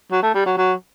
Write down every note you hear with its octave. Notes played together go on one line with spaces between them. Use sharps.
F#3
A3
G3
F#3
F#3